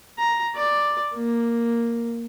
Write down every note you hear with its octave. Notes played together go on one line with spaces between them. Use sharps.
A#5
D5
A#3